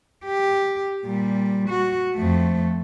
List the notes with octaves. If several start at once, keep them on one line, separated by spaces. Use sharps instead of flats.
G4
A#2 G3
F#4
F2 A3